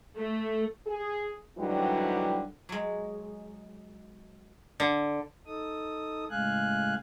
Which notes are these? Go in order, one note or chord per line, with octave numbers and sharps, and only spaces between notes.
A3
G#4
G#2 D3 E3 F#3 G3 G4
F#3 G#3
D3
D#4 A4 D#6
A2 C#3 G#3 F5 G#5 F#6